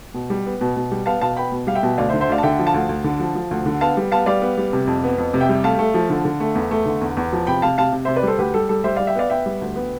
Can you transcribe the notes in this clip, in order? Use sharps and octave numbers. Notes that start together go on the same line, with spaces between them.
B2
G3
B3
B2
B2
G3
B3 F5 A5
B2 F5 A5
B3 G5 B5
B2
G3 F5
E5 G5
B2
D2 D5 F5
C5 E5
D3
C5 E5
D2 D5 F5
A5
D3 E5 G5
F3
F5 A5
D2
D2
D3
F3
F3
D2
D3
B3 F5 A5
G3
B3 F5 A5
G3 D5 F5
B3
G3
C3
F2
B3
F2
C3
E5 G5
G3
A3 F5 A5
A3
F3
D3
D3
A3
E2
A3
D3
E2
E2
F3
C3 G5 B5
C3 F5 A5
C3 F5 A5
C3
C3 C5 E5
B4 D5
G3 A4 C5
D2 G4 B4
G3 A4
G3 A4
G3 C5 E5
G3 D5 F5
E5 G5
B3 D5 F5
B3 E5 G5
G3
D2
B3